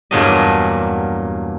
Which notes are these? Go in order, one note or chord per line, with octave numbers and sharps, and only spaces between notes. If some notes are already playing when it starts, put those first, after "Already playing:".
E2 G2 A#2 F#3 D4 D#5